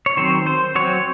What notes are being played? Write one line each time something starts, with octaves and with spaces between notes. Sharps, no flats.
C#5
D#3 F#3 C4 C5
C5
F#3 C4 C#5